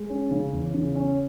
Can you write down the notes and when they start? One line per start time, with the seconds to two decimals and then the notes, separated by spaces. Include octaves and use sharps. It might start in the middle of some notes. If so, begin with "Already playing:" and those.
Already playing: G#3
0.10 C#4
0.31 C#3
0.53 E2
0.74 C#3
0.95 C#4